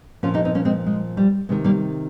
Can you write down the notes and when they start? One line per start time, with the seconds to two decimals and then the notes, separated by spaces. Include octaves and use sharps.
0.23 A#2 F3 C#4 F4
0.34 D#4 G4
0.45 C4 D#4
0.55 A#3 C#4
0.65 G#3 C4
0.87 G#3
1.17 G3
1.49 C3 D#3 G#3
1.64 G3 A#3